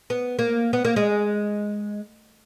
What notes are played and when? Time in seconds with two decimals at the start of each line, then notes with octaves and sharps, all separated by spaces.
0.10 B3
0.39 A#3
0.73 B3
0.85 A#3
0.96 G#3